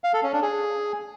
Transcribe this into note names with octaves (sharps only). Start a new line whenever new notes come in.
F5
A4
C#4
D4
G#4